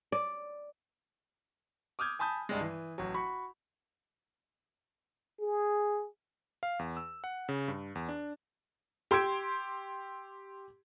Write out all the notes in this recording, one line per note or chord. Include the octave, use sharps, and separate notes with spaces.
D5
D6 D#6 F6 G6 G#6
G#5 A5 B5 D#6 G6
G2 G3 G#3
E3
A1 F#3
F#4 B5 C#6
G#4
F5
E2
E6
F#5
C#3
G2
E2
D4
G4 C6 E6 G#6 D7